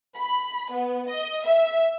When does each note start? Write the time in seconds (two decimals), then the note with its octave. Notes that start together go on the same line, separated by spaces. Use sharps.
0.14 B5
0.71 B3
1.08 D#5
1.43 E5